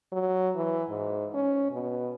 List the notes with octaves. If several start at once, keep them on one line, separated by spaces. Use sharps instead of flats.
F#3
E3
G#2
C#4
B2